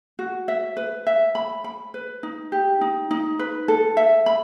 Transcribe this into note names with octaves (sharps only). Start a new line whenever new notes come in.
F#4
E5
B4
E5
B5
B5
B4
D#4
G4
D#4
D#4
B4
A4
E5
B5